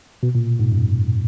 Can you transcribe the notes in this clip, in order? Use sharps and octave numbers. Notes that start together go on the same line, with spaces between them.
B2
A#2
G#2
F#2